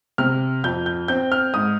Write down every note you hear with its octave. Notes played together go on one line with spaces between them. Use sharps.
C3 F6
F2 G6
G6
C4 G6
F6
G#2 D#6